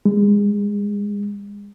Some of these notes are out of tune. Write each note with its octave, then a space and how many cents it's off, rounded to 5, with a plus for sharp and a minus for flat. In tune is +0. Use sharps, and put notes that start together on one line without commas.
G#3 -25